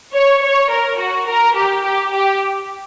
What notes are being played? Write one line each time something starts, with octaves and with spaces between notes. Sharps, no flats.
C#5
C#5
A#4
F#4
A#4
G4
G4
G4